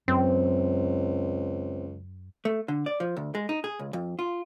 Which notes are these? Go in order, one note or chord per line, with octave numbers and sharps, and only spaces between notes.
C#2 F#2 C4
A3
D3
D5
F3
D2
G#3
D#4
G#4
C#2
F2
F4